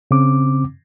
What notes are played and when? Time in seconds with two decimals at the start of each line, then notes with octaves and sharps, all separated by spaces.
0.11 C#3 C4 D6